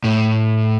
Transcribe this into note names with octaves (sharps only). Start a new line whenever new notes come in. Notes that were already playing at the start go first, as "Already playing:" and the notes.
A2